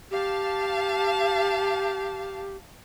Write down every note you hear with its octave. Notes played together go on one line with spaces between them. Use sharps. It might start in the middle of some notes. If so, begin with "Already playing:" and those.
G4 F5 A5